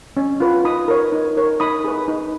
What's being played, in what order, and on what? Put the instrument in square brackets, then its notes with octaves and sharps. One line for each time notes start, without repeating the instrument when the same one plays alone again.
[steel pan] C#4
F4 B4
D#4 B5 D#6
A#4 C#5
D#4
A#4 C#5
D#4 B5 D#6
G#4 B4
D#4